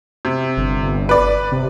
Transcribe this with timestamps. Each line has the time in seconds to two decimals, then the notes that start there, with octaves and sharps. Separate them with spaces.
0.25 C3
0.57 G1
1.09 B4 D5
1.52 C3